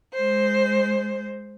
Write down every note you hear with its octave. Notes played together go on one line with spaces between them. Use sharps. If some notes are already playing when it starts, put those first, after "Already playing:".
G#3 C5